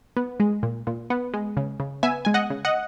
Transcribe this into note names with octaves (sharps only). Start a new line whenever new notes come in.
B3
G#3
A#2
A#2
B3
G#3
C#3
C#3
B3 E5 G#5
G#3 G#5
D#5 F#5
C#3
D#5 F#5